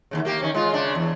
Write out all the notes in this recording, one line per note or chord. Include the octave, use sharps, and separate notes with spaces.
D#2 A2 C#3
A#3 G4
D#3 C#4
G#3 F4
C#3 D4
E2